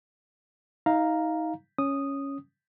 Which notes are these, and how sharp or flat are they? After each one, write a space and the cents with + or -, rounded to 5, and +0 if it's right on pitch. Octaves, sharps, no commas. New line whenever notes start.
D#4 +30 F5 +0 A#5 +0
C#4 +0 D#6 -5